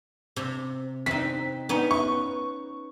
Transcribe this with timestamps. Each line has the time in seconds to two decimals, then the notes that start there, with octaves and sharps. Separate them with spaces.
0.36 C3
1.06 C4 D#4 B6
1.69 B3 C#4 D#4
1.91 C#6